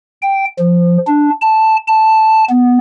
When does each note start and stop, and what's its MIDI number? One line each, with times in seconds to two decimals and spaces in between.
0.22 0.45 79
0.59 0.98 53
1.07 1.30 62
1.42 1.76 81
1.88 2.44 81
2.49 2.78 59